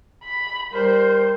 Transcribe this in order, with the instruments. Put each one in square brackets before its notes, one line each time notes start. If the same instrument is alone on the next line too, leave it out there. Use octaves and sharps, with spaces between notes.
[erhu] B5
[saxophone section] G3 A#4 [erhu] C5